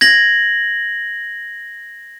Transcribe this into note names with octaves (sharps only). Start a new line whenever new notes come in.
G#6 A#6 F#7